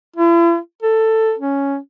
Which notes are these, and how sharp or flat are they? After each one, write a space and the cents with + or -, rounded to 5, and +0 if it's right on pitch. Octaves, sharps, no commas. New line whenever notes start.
E4 +45
A4 +10
C#4 +5